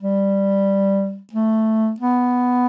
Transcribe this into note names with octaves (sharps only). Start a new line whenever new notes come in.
G3
A3
B3